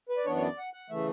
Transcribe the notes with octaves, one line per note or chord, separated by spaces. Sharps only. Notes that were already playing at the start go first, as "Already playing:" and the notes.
B4
D5
F#2 E3 B3 D4 C#5
C#5
D5
F#5
F#5
C#3 E3 A3 E5